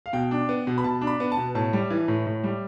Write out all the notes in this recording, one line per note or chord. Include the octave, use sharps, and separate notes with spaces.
F5
B2 G5
D4
B3
B2
B5
B2 A5
D4
B5
B3
A5
B2
A2 A5
G3
E3
A2
A2
G3